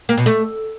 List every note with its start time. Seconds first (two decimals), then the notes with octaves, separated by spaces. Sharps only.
0.09 A#3
0.17 B2
0.26 A3